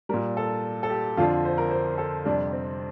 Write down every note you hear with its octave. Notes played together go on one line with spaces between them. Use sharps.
A#2 G3 A#4
A4
A4
G4
F2 D3 F3 F4
C5
A#4
C5
A4
F2 C3 G3 D4
C4